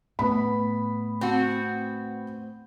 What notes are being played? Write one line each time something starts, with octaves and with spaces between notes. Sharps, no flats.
A2 B3 B5
C4 F#4